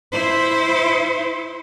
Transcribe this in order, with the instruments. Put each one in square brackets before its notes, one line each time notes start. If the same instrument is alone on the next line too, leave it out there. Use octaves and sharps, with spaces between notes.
[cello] E4 C5